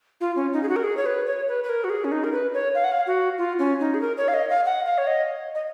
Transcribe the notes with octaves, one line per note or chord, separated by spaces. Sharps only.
F4
C#4
D#4
G#4
F#4
A#4
G#4
C#5
B4
C#5
B4
B4
A#4
F#4
G#4
C#4
D#4
A#4
B4
C#5
F5
F#5
F5
F#4
F4
C#4
D#4
G#4
A#4
C#5
F5
D#5
F5
F#5
F5
C#5
D#5
D#5